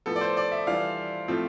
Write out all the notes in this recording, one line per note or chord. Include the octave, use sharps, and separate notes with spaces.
A2 F3 B3 A4
D5
C5
D5
E5
E3 G3 D4 F4 F5
A2 F3 A3 C4 F4